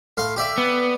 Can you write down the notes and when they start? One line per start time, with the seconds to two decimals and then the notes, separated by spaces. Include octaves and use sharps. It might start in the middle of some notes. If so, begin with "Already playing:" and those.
0.17 A2 F5 C6
0.36 G4 D5 E5
0.58 B3